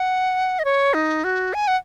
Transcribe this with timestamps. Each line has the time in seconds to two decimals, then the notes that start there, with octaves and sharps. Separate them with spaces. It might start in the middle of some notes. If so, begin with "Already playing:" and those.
Already playing: F#5
0.59 D#5
0.65 C#5
0.94 D#4
1.24 F#4
1.54 G#5
1.68 F#5